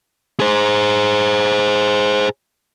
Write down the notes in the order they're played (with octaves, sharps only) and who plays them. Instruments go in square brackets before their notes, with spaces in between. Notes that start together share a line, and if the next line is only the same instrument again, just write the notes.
[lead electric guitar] G#4 C5